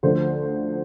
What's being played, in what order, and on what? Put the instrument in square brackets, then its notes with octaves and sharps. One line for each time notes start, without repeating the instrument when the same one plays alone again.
[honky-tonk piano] D2 D3 F3 A3 C5